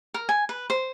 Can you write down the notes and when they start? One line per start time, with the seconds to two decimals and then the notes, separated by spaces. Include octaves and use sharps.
0.14 A#4
0.29 G#5
0.49 B4
0.70 C5